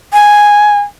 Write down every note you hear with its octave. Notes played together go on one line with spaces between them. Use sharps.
G#5